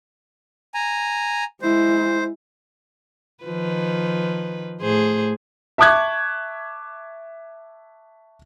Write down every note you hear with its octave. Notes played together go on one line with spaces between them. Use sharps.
G#5 A#5
G#3 E4 C5
D#3 F3 B4
A2 G#4 C5
E5 A5 C#6 D6 F#6 G#6